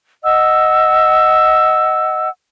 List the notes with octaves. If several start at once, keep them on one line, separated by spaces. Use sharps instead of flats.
D#5 F#5 E6